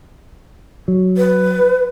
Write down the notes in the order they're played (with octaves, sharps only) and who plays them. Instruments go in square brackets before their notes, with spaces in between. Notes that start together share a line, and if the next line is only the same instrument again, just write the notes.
[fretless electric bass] F#3
[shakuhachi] B4